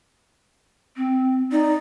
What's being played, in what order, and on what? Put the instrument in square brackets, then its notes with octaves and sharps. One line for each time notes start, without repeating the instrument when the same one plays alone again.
[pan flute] C4
[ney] D#4 [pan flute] D5